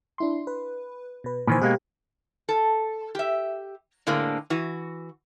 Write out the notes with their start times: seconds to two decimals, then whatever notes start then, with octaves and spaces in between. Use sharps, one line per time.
0.18 D4 E4 C6
0.47 B4
1.24 B2 B4
1.47 A#2 D#3 E3 C5 G#5 B5
1.62 B2 G#3 A#3 G4
2.49 A4
3.15 G4 E5
4.07 A2 D3 G#3 A#3 C4
4.50 E3 F#4